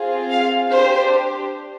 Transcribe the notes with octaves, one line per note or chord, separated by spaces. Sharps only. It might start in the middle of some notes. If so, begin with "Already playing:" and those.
Already playing: C4 F4 G#4
F5
D4 G4 C5